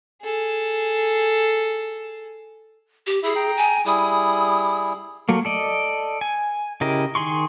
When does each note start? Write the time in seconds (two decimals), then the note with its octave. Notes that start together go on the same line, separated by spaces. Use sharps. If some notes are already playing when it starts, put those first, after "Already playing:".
0.22 G#4 A4
3.07 G4
3.23 E4 G#4 E5
3.36 G5 A#5
3.57 G#5
3.86 G3 E4 G#4 D#6
5.29 F#3 A3 A#3
5.45 A4 D5 D#5
6.21 G#5
6.81 C#3 E4 G4 A#4 D#5
7.15 D#3 G#4 C6 C#6